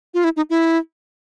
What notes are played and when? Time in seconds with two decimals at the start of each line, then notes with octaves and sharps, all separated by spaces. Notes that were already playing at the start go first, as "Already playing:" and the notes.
0.14 F4
0.24 E4
0.37 D#4
0.50 E4